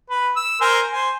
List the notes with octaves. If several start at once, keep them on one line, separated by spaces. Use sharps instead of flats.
B4
E6
A#4 C5 G#5
C5 G#5